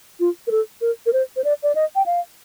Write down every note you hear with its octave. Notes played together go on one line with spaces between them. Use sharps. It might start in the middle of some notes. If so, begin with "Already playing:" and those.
F4
A#4
A4
A#4
A#4
C5
C5
D5
D5
D#5
G5
F5